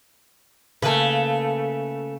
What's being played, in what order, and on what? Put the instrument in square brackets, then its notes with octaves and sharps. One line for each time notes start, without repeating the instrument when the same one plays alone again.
[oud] C#3 A#3 [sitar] A3 B4